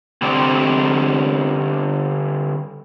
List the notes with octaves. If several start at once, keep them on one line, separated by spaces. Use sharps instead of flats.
D3 G3 C4 D5